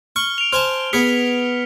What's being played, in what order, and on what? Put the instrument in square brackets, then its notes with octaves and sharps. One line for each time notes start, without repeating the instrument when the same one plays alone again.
[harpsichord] C#6 [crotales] F6 G7
[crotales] D7 F7
[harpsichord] C5 G#5 A5 [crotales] F6
[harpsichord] B3 G#4 [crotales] F6 B6 C#7